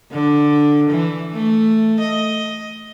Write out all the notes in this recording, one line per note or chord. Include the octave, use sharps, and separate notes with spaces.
D3
E3
A3
D#5